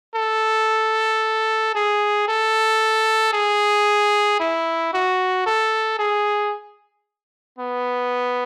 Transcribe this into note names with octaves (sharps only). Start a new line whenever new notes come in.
A4
G#4
A4
G#4
E4
F#4
A4
G#4
B3